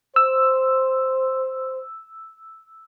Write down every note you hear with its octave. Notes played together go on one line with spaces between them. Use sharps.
C5 E6